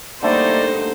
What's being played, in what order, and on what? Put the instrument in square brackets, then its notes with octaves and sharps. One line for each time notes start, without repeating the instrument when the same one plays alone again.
[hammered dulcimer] D3 G3 A3 [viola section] A#3 D#4 [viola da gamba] C5 [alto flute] D5